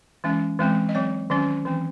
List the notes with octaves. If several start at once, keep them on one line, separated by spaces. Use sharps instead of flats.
E3 G#3 C#4
E3 G#3 C4
D#5
F#3 C4 C#5
D#3 F#3 C#4
E3 C4